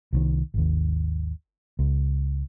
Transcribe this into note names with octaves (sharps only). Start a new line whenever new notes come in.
C2 D3 D#3
G#1 D#2
C#2